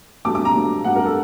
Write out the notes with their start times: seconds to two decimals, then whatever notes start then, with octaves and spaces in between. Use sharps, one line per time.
0.25 G2 F#3 A3 D6
0.35 D6
0.45 A#5
0.54 G2 F#3 A3
0.84 G2 F#3 A3 F#5
0.95 A#4
1.05 A4